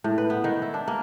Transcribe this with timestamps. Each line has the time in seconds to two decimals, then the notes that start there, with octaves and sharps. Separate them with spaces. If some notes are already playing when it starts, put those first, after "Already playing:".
0.04 A2
0.18 B4
0.30 B3
0.44 D#3
0.62 E4
0.74 D4
0.88 A#3